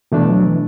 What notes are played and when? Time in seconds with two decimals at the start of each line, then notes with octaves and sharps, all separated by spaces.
0.12 B2 E3 A3 D4
0.28 F#3
0.45 E3